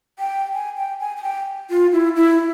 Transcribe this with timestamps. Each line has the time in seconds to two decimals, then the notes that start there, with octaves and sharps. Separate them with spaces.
0.19 G5
0.54 G#5
0.77 G5
1.00 G#5
1.17 G#5
1.23 G5
1.70 F4
1.93 E4
2.16 E4